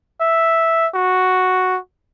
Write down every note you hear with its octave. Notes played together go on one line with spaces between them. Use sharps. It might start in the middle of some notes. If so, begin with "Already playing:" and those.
E5
F#4